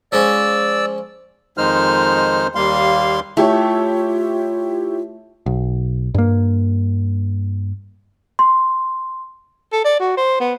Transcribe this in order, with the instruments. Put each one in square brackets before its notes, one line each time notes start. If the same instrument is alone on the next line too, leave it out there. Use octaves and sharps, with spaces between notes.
[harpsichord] F3 G#3 C#4 [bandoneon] D5 E6
[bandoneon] F2 D#3 G#3 D#4 C5 F6
D#2 G3 A#3 F5 C6
[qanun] A3 [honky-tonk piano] E4 G4 C#5 [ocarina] F4
[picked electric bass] B1
G2 A#3
[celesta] C6
[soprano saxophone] A4
D5
F#4
C5
B3